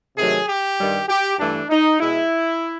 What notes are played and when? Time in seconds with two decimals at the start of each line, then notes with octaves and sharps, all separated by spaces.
0.17 C3 D#3 F#3 A3 G#4
0.47 G4
0.77 G2 D#3 G3
1.08 G4
1.39 G2 E3 A3 D4
1.70 D#4
2.00 B2 G#3 E4